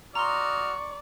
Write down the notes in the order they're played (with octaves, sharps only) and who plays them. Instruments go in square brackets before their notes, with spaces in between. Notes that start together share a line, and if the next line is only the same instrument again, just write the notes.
[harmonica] F#4 D#5 F6 [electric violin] D5 [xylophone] A#5 C6 [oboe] C#6